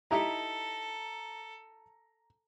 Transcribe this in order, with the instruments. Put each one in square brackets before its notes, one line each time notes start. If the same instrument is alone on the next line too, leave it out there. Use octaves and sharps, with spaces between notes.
[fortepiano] D#4 E4 G4 [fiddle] A4 [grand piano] A#5